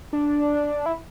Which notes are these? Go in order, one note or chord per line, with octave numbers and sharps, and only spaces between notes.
D4
E4